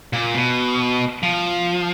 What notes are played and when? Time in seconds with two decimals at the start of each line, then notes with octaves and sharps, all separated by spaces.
0.13 A#2
0.34 B2
1.23 F3